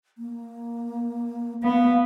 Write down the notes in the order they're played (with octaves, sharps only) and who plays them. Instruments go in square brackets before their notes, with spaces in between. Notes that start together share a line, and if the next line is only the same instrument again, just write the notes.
[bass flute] A#3
[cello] B3 [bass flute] F5